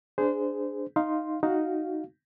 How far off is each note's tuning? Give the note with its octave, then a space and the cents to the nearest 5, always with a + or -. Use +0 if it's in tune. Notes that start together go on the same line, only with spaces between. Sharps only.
D4 +0 G#4 +0 C5 -25
D#4 +0 F5 +0 C6 +0
D#4 +0 F#4 +0 F5 +0